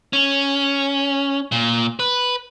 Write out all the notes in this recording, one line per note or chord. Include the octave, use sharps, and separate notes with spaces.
C#4
A#2
B4